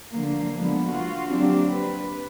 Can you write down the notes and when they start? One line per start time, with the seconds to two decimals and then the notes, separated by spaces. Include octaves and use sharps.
0.12 D3 F3 A#3
0.57 D3 F3 G#3 B3
0.91 F4 F#4
1.30 F#3 A#3 C4 D4 G4
1.69 B4